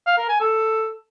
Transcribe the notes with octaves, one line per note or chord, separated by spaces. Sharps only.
F5
A#4
G#5
A4